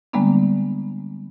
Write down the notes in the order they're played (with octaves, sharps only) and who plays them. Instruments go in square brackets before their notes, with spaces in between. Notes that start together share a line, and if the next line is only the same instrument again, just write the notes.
[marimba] D3 G3 G#3 A#3 B3 D4